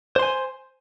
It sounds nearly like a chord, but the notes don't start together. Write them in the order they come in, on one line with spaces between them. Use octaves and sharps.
C5 C6 G#5